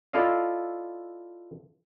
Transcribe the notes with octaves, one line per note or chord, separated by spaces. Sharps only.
E4 F4 A4 D5 D#5 F5